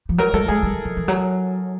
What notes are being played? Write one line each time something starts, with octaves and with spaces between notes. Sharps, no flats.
F3
F#3 A#4
G3 A4
G#3 G#4
G3
F3
E3
F#3